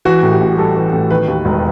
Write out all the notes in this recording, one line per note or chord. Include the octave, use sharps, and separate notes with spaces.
E3 F#4
A2
G4
A1
G3 A4
E3
A2
D#3 B4
D#2
E1